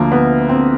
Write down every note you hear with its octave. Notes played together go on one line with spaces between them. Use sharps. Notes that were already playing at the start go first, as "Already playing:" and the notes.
Already playing: D2 D3 F3 A#3
B3
C4